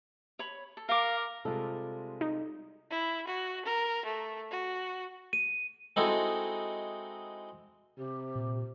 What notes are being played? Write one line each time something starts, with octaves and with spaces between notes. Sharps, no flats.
C#5 B5
A4
A#4 F5 D6
C3 G3 G#3 F4 A4
D#4
E4
F#4
A#4
A3
F#4
D#7
G#3 C4 D#4 E4 F#4 A4
C3 G4
A#2